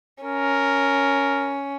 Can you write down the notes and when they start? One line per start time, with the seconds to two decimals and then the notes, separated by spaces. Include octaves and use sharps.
0.24 C#4 A#4